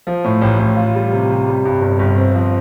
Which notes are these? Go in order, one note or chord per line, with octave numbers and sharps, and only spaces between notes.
F3
A2
A1
A1
F4
G3
C3
C3
G3
G2
G1
G1
C4
F3